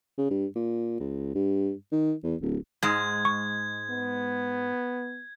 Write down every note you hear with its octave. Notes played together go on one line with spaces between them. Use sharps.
C#3
G2
A#2
C#2
G2
D#3
E2
D1
G#2 G#3 G#6
C#6
B3